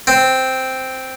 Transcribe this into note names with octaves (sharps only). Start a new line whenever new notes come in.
C4